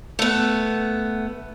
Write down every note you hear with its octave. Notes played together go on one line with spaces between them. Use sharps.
A3 B3